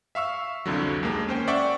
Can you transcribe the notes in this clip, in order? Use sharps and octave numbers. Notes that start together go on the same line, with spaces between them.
E5 F5 C#6 E6
C2 F2 D3 F#3
D#2 G#3 A#3
C#4 C5 G5
D5 E5 F#5 G5 C#6